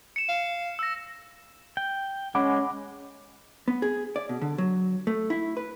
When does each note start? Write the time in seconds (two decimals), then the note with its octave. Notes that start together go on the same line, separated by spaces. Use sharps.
0.16 C#7 E7
0.29 F5
0.79 E6 A#6
1.77 G5
2.35 G#3 C#4 F#5 B5 D6
3.68 B3
3.82 G#4
4.16 D5
4.29 B2
4.41 D3
4.58 F#3
5.07 A3
5.30 E4
5.57 B4